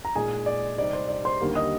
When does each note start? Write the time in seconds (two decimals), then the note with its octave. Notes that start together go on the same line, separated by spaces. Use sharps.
0.05 A#5
0.15 A#2 G#3 D#4 G#4 G#5
0.46 D5
0.77 C3 G3 C4 D#4 D5
0.93 C5
1.09 D5
1.25 C5 C6
1.41 D#2 D3 G3 A#3
1.55 D#5 D#6